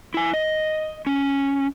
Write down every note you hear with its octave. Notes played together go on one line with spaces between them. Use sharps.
E4 G#5
D#5
C#4